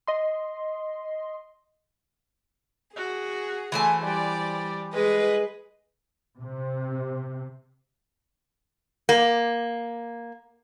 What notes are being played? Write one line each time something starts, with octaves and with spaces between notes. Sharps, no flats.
D#5 C6
F#4 G#4
E3 A3 C5 G#5
G3 D5
G#3 G#4 B4 D#5
C3
A#3